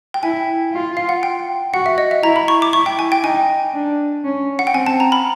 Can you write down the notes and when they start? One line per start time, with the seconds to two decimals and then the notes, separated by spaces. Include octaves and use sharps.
0.14 G5
0.23 E4 G#5
0.73 F4
0.97 F5
1.09 F#5
1.23 G5
1.74 F#4 F#5
1.86 E5
1.98 D#5
2.11 E5
2.23 E4 A#5
2.36 B5
2.48 C#6
2.62 D6
2.73 E4 C#6
2.86 G5
2.99 G#5
3.12 G5
3.24 D#4 G#5
3.74 D4
4.25 C#4
4.59 F#5
4.67 G5
4.74 C4 G#5
4.86 A5
5.00 A#5
5.12 B5